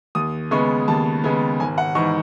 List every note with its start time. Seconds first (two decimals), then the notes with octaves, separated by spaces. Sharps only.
0.15 D#2 D#6
0.51 C#3 G#3 B3 C#6
0.88 D#2 A5
1.24 C#3 G#3 B3
1.60 G#1 G#5
1.78 F#5
1.95 G#2 E3 C#6